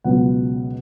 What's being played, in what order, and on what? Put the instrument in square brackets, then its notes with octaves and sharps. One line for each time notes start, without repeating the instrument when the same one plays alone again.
[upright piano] C#2 B2 F#3 B3 F#5